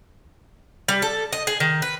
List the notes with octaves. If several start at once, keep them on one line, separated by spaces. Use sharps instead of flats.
G3
A4
D#5
G#4
D#3
B4